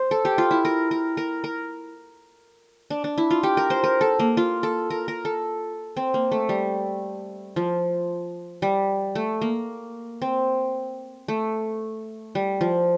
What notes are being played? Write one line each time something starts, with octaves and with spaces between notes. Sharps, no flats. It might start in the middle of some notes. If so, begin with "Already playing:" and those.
Already playing: C5
A4
G4
F4
E4
A#4
A#4
A#4
A#4
D4
D4
E4
F4
G4
A#4
C5
A#4
A4
A#3
F4
A4
A#4
A#4
A4
C4
A#3
A3
G3
F3
G3
A3
A#3
C4
A3
G3
F3